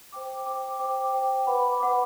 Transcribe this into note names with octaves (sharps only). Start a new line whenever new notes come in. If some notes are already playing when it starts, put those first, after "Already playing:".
C5 G5 D6
C5 G5 D6
C5 G5 D6
C5 G5 D6
B4 F#5 B5 D6
B4 F#5 B5 D6